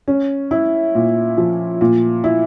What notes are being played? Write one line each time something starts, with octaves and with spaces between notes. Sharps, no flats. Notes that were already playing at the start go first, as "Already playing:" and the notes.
C#4
E4
A#2
F3
A#2
E4